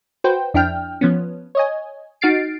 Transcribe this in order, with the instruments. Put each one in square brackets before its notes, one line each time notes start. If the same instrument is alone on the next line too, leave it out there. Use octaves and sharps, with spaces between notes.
[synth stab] F#4 B4 C5 G5
F2 D4 E4 G5 F6
F3 B3 C#4
C#5 D#5 G#5
D#4 F#4 F6 A6 C7 D7